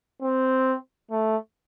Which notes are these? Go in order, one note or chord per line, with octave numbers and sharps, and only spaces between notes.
C4
A3